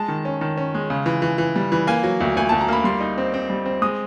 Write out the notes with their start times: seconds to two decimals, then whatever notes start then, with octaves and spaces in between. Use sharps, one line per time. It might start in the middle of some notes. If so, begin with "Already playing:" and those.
Already playing: G#3 A5
0.08 D#3
0.25 C#4
0.41 D#3
0.58 C#4
0.74 G#3
0.90 C#3
1.06 E3
1.22 E3
1.38 E3
1.56 G3
1.72 E3
1.87 A#3 G#5
2.03 F#3
2.20 D2
2.36 D2 G#5
2.49 D2 A5
2.61 A#5
2.68 A#3 B5
2.84 G3 C6
3.01 D#4
3.18 C4
3.34 C4
3.50 G3
3.66 C4
3.82 G#3 D#6